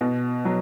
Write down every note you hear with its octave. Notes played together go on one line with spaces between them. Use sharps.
B2
F#3